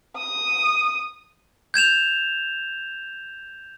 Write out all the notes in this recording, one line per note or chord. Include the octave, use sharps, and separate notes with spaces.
D#6
G6 G#6 E7 F7